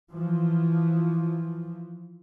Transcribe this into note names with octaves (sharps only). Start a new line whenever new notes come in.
E3 F3